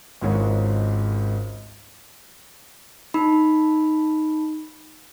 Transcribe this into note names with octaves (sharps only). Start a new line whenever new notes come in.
G#1 C#2 G#2 C#5
D#4 B5